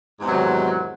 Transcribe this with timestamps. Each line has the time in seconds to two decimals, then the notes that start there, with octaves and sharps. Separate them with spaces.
0.18 G#2
0.21 E2
0.24 C3
0.27 F#3
0.31 D#3